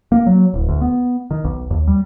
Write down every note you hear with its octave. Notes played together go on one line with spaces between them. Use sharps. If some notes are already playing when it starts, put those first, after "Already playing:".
A#3
F#3
D1
D2
B3
D#3
B1
D#2
G3